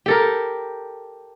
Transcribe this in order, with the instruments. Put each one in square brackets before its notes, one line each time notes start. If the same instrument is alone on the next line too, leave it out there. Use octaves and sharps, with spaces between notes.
[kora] G4 A4 A#4